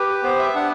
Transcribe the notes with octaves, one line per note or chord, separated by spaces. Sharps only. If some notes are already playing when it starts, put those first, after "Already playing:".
Already playing: G4 B4
B3 C5
E5
D4 F#5